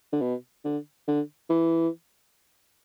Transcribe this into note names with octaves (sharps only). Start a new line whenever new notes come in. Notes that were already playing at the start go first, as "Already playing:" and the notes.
D3
B2
D3
D3
E3